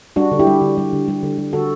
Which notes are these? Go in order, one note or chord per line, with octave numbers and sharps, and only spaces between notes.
G3 D4 F#4
D3
E4 G4
G3
D3
G3
D3
G3
D3
G3
D3 F#4 A4